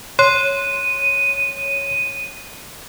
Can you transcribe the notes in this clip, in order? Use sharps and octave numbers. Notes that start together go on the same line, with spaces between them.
C#5 C6 D#7